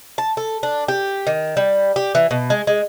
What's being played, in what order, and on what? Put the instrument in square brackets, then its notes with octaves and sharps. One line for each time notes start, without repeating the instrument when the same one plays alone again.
[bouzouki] A5
A4
D4
G4
D#3
G3
G4
E3
B2
G#3
G#3